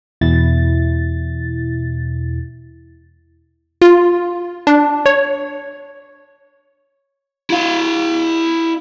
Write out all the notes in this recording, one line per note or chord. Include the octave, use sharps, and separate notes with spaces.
E2 B2 E4 A6
F4
D4
C#5
E4 F5